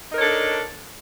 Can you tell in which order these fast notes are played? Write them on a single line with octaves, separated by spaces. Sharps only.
D#4 A#4 C#5 A4 D4